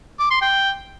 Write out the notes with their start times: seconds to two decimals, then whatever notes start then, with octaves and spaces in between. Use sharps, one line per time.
0.19 D6
0.30 C6
0.41 G5